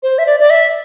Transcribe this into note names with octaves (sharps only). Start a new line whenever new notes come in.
C5
E5
D5
D5
E5